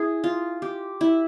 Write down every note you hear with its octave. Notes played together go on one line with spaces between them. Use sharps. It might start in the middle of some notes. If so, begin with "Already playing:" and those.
Already playing: E4 G#4
F4
G4
E4